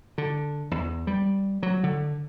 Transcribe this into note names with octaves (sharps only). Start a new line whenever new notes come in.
D3
E2
G3
F#3
D3